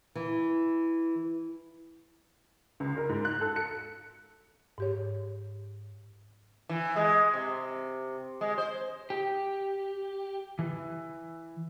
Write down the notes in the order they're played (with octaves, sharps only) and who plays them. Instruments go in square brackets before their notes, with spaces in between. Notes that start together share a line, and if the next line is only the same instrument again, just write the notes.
[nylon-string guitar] E3
[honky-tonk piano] C#2
A#4
G#2
F#6
A4
C#7
[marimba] G#2 G4 C#5
[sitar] E3
G#3
C3
G#3
C5
[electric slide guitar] G4
E3